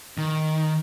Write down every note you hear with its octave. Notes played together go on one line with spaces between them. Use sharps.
D#3